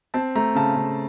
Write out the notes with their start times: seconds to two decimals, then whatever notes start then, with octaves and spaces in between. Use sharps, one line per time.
0.14 C4 A5
0.35 A3 A#5
0.55 C#3 A5
0.76 C#3